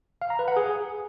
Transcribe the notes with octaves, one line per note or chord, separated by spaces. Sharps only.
F5
A#5
B4
F#5
G#4